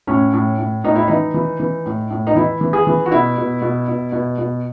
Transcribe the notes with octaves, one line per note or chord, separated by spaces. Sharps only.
A2 C#4
A2
A2
A2 D#4
E4
E3 D#4
E3
E3
A2
A2
D#4
E3 E4
E3
G#4
E3
F#4
B2 E4
B2
B2
B2
B2
B2